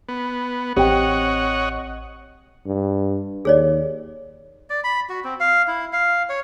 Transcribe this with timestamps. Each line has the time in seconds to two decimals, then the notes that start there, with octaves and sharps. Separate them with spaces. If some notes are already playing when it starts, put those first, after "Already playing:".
0.08 B3
0.76 A1 C4 G4 C#5 D#5 F#5 G5
2.67 G2
3.45 D#2 G#4 C#5 D5
4.70 D5
4.84 B5
5.09 F#4
5.24 C4
5.40 F5
5.68 E4
5.93 F5
6.29 C#5